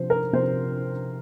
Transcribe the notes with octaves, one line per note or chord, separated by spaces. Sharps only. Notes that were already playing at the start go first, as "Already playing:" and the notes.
Already playing: C3 F3 C5
A#4
C3 F3 C5